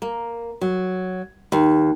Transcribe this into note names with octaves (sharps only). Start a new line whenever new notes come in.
A#3
F#3
D#2